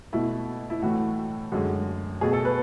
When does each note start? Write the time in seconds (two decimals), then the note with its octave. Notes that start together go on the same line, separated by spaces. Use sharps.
0.13 B2 A3 E4
0.70 E4
0.82 A2 E3 A3 F#4
1.52 F#2 D3 G#3 F#4
2.21 B2 A3 G#4
2.33 A4
2.45 B4